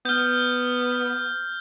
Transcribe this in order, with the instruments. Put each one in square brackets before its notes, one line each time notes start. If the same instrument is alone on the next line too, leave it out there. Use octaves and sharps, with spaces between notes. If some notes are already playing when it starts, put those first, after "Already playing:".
[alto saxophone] B3 [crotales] F6 G6